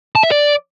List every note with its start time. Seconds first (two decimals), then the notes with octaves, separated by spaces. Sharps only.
0.15 A5
0.23 E5
0.31 D5